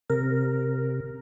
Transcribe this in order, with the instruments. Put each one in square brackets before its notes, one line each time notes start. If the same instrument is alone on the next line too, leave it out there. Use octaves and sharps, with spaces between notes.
[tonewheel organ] C3 [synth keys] A#4